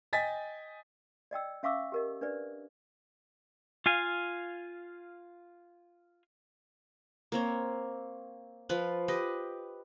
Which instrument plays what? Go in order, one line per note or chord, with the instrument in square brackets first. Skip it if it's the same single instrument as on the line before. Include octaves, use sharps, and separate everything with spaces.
[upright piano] D#5 G5 G#5 A6 B6
[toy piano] D5 D#5 G5 E6
C#4 E5 F5 C#6 D6 E6
G4 A#4 D#5
D4 B4 D5
[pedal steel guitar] F4 F5 G#5
[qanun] A#3 C4 C#5
F3 F4 B4
G4 B4 D#5